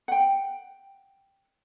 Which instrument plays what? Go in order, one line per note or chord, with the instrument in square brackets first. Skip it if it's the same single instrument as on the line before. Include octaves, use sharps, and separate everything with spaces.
[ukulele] F#5 G5